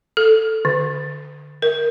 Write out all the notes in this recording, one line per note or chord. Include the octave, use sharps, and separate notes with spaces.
A4
D3
A#4